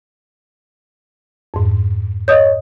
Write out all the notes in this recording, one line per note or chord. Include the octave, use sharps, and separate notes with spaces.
F2 G#2
C#5 D#5 D#6 G6